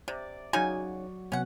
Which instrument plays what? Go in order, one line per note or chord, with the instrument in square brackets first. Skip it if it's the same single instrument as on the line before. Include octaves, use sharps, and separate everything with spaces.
[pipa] C3 [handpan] D5
[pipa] C#3 D#4 G#5 [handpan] F#3 F#4
[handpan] C3 F#3 B3 [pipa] C#4 F#5